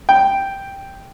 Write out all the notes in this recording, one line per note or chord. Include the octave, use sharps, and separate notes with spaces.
G5